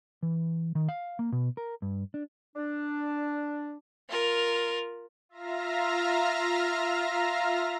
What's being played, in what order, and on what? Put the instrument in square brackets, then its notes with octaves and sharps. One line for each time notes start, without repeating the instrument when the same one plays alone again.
[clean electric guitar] E3
D#3
F5
A#3
B2
A#4
G2
D4
[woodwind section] D4
[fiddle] F4 A#4
[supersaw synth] F4 E5 F5 A#5 F6 A#6